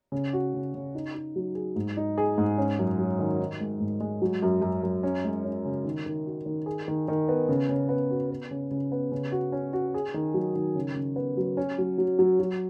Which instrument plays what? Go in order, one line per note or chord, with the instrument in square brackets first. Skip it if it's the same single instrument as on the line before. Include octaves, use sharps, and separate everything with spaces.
[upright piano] C#3
F#4
C#3
C#3
D#4
D#4
F#3
G#4
G#2
D#4
G#4
G#2
C#4
F#2
F#3
D#3
D#4
G#3
G#2
G#3
F#3
F#2
F#2
F#2
C#4
G#3
C#4
C#3
D#3
D#3
F#4
D#3
G#4
D#3
D#3
B3
C#3
C#3
B3
F#4
B3
C#3
C#3
B3
C#3
F#4
C#4
F#4
G#4
D#3
F#3
D#3
C#3
C#3
B3
F#3
C#4
F#3
F#3
F#3
F#3